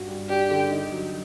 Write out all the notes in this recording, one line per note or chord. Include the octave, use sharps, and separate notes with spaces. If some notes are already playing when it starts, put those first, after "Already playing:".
Already playing: G2 F#4
G3
D4 G4
D3
D#4
F#3